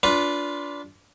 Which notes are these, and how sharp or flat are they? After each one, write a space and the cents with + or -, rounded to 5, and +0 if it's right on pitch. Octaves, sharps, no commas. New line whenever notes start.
D4 -25 F4 +5 B4 +0